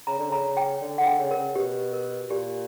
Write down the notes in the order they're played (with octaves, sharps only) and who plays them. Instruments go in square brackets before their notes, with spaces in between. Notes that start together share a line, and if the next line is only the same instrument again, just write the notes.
[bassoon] C#3 [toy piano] A#5
[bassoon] D3
[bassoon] C#3 [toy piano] A#5
[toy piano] G5
[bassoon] D3
[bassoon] D3 [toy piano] F#5
[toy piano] G5
[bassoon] C#3
[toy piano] A#4
[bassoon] C#3
[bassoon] B2 [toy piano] G4
[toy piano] A#4
[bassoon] A#2 [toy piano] G4